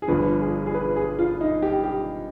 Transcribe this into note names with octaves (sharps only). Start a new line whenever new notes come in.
G#4
G1 G2 F3 B4
G#4
G#4
B4
G#4
F4
D#4
G4
G4